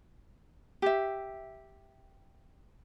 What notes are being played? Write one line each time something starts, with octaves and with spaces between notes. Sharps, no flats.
G4 E5